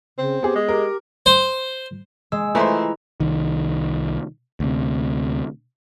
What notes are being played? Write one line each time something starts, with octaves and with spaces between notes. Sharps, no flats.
C#3 C4
B3 G4 G#4
G#3
G4 A#4
C5
G#3 E6
E3 A3 E4 F4 B4 C5 A#5
C2 D#3
D2 C3